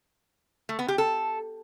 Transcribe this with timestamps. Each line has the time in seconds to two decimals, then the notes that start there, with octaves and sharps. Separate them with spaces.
0.69 A3
0.79 B3
0.88 G4
0.98 A4